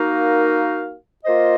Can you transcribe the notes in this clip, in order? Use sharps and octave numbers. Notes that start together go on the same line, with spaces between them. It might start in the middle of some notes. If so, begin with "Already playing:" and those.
Already playing: A#3 D#4 F#4 A#4 F5
A#3 F4 C5 D#5